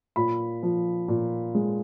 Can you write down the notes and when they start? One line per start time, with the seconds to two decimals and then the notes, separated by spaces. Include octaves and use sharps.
0.16 A#2 B5
0.63 F3
1.08 A#2
1.55 G#3